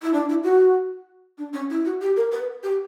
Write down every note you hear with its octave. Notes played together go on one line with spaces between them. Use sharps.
E4
D4
E4
F#4
D4
C#4
E4
F#4
G4
A#4
B4
G4